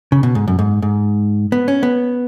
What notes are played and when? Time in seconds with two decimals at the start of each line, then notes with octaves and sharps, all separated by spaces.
0.12 C#3
0.23 B2
0.35 G#2
0.48 F#2
0.59 G#2
0.82 G#2
1.52 B3
1.68 C#4
1.83 B3